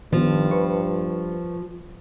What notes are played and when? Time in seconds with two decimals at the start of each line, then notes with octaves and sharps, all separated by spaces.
0.13 G2 D#3 F3 B3
0.51 B4 C5 C#6